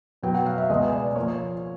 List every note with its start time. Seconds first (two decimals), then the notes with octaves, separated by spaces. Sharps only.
0.23 B2 F#3 B3 G5
0.34 F#5
0.46 F5
0.58 E5
0.70 C#2 B2 G#3 B3 D#5
0.93 D5
1.16 F3 A#3 C#5